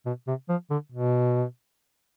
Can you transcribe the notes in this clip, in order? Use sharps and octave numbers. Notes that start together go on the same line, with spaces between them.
B2
C3
F3
D3
B2